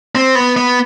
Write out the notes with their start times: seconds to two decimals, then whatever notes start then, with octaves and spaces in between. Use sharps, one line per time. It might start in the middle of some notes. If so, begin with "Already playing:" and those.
0.15 C4
0.35 B3
0.57 B3